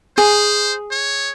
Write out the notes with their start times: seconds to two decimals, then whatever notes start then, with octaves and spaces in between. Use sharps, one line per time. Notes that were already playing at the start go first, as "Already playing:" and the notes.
0.18 G#4 C5
0.91 C#5